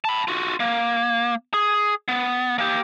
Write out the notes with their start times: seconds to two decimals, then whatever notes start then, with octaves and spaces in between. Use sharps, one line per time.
0.05 A5 B5
0.28 F4 F#4
0.60 A#3
1.54 G#4
2.08 B3
2.58 A#3 G4